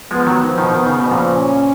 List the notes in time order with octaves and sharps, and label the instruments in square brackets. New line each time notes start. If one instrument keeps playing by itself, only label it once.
[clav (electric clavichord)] F3 G#3 [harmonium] B3
[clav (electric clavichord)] D#3 F#3
[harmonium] F3
[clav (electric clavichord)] B2 D#3
[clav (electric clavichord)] D#3 [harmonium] B3
[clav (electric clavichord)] C#3
B2
[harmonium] F3
[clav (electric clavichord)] A#2 C#3
[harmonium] C#4